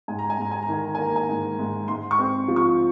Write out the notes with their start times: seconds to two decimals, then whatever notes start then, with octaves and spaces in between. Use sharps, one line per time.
0.08 G#2 G#5
0.19 A#5
0.30 G#5
0.38 G#2 A#5
0.51 G#5
0.62 A#5
0.68 D#3 G#5
0.84 A#5
0.95 A#3 G#5
1.05 A#5
1.16 G#5
1.29 G#2
1.59 G#2
1.88 G#2 C6
2.11 C#6
2.19 C4
2.48 F3
2.56 C#6